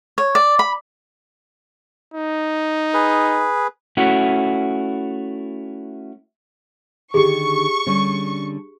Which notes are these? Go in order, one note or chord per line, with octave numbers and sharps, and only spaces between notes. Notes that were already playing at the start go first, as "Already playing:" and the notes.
C#5
D5
B5
D#4
G#4 B4
A3 C#4 E4 F#4
D3 D#3 G4 G#4 C#6
D3 G3 C#4